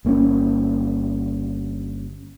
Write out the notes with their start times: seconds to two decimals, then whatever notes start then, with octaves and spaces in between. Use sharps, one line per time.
0.05 G1 A#3 C4 C#4